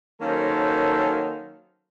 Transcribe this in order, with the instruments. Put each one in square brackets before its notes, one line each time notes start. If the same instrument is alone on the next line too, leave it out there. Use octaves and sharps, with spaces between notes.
[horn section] D#3 F#3 A#3 C#4 A4 C5